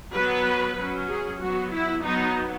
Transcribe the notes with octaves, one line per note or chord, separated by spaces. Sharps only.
F#3 B3 B4
F#3 C#4
G#4
F#3 B3 F#4
E4
F#3 B3 D#4